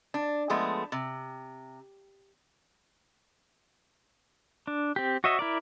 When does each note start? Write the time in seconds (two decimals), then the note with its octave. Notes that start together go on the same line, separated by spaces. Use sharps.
0.14 D4
0.50 F3 G#3 A3 B3
0.92 C3
4.67 D4
4.96 C4 G4
5.24 F#4 C#5 D#5 E5
5.39 E4 A#4 D5